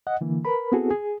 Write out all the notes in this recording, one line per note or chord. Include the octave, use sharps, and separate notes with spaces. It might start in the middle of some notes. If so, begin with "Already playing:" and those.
D#5 F#5
D3 E3 A#3
A#4 B4 B5
B3 C4 E4 F#4 G#4 A4
G#4